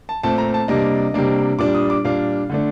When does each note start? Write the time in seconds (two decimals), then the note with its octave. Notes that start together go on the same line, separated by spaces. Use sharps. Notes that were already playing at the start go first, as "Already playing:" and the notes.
0.09 A5
0.23 A#2 A3 C4 A5
0.38 A#5
0.54 A5
0.68 C3 G3 A#3 D4 D#5
1.14 C3 G3 A#3 D4
1.59 A#2 G3 D4 D6
1.75 D#6
1.90 D6
2.04 A#2 G3 D4 F5
2.50 D3 A3 D4